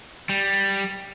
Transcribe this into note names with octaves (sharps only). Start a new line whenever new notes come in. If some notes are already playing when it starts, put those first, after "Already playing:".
G3